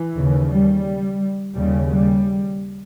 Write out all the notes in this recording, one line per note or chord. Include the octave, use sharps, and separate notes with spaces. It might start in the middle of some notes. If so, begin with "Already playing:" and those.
Already playing: E3
D#2 C#3
G3
D#2 C#3 G3
G3